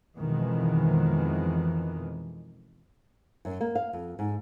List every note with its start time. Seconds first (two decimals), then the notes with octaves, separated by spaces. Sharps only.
0.18 F2 B2 D#3 E3 G#3
3.45 F#2
3.61 A#3
3.75 F5
3.93 F2
4.19 G#2